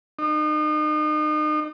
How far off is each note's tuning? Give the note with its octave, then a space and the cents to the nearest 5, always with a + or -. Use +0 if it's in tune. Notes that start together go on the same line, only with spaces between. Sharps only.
D#4 -35